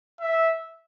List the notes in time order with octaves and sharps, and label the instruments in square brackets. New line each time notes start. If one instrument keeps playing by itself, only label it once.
[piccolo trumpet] E5